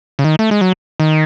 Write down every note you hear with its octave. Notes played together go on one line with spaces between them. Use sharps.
C#3
D#3
A3
G#3
F#3
D#3